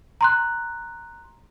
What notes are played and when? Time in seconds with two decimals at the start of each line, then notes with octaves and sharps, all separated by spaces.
0.21 A#5 C6 F#6